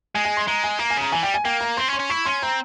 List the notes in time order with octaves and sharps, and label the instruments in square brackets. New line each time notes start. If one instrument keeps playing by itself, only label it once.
[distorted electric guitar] G#3 [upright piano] G#5
[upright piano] G#5
C6
[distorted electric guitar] G#3 [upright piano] A#5
[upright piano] G#5
[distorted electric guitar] A#3 [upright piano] A#5
[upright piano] G#5
[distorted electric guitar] C#3 [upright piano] A#5
[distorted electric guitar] E3 [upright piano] G#5
[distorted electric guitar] G3 [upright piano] G5
[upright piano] G#5
[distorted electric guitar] A#3 [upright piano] G5
[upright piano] A#5
[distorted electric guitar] C4 [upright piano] C6
[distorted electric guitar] C#4
[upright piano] C6
[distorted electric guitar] C#4
[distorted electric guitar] E4 [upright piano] C#6
[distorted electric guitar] C#4 [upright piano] C6
[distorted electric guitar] C4 [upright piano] A#5